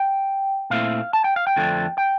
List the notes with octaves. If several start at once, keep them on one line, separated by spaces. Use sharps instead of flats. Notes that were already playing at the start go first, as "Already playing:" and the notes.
Already playing: G5
A#2 A3 C4 E4 F5
A5
G5
F5
G5
F2 D3 F3 A3 D4
G5